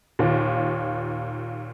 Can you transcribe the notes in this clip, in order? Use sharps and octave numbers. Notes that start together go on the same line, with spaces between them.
D#2 A#2